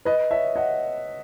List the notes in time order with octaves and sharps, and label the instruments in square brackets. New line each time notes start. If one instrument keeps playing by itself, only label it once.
[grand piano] B4 D#5
C#5 E5
D#5 F#5